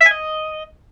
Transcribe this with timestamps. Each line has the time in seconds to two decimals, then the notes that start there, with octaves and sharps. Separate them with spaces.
0.01 E5
0.06 G#5
0.11 D#5